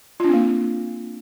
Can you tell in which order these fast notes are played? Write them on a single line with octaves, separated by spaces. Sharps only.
F4 D4 C4 A#3